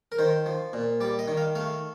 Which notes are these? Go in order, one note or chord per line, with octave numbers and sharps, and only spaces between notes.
A#4
D#3 C5
F3
A#2
G3 D5
D#5
D#3
F5
A3 F5